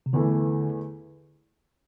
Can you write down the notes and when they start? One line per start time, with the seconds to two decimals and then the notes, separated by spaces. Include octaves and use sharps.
0.06 C3
0.13 E2 D3 E3 A3